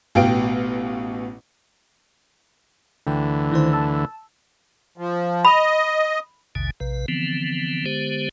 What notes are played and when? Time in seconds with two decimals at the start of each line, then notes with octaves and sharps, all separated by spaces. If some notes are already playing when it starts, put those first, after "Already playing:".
0.15 A1 B2 F5 G5 D7
3.07 D2 D3 E3 G5
3.52 D#3 E4 C5
3.73 A5 E6
4.98 F3
5.45 D#5 B5
6.55 A1 D#2 B2 D3 G#5
6.80 A#1 C3 B4
7.08 D3 E3 F3 B3 C4
7.86 D3 G#3 B3 G4 C5